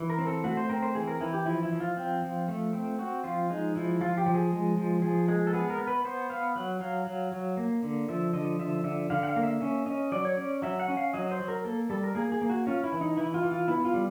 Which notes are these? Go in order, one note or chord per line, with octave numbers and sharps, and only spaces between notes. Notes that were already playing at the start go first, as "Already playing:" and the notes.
Already playing: E3
A#4
C4
A4
A3 F#4
C5
C4 A#4
C5
E3 G#4
A#4
E3 E4
G4
F3 E4
E4
F3
F4
C4
F3
A3
C4
C4 F#4
F3 F4
G#3 D#4
F3 E4
F3 F4
G4
F3
G#4
G#3
F3
F3 G#4
G#3 G#4
A4
B3 G#4
A#4
B3
B4
B3 C5
B3 F5
F#3 F#5
F#3 F5
F#3
F#3
A#3
D3
F3 E5
D3 D#5
F3 E5
D3 E5
D3 F5
F#5
F5
A#3
E5
C#4 E5
C#4 D#5
F#3 D5
C#5
C#4 D5
F#3 E5
F#5
C#4
F5
F#3 D#5
C5
F#3
A#4
A#3 A4
G3 A4
A#4
A#3 G#4
G#4
A#3
F#4
C#4 F4
E4
E3
D#4
E3 E4
F4
E3
F4
B3 E4
F4
G3